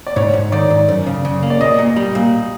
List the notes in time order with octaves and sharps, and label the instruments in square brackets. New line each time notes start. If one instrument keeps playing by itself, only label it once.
[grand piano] D5
[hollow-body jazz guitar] G#2 [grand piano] C#5
[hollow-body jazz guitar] G#2
[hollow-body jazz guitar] D#3 [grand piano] D5
[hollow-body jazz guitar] G#2
F#2
C#3
C#3
A#3
[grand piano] D5
[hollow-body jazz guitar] A#2 [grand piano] D#5
[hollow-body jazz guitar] A#2
G3
A#2